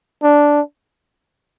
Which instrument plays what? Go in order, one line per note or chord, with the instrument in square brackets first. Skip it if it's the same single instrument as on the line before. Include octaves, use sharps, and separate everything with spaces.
[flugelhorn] D4